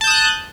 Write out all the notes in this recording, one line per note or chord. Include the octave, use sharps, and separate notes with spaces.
A5 D#6 F#6 G6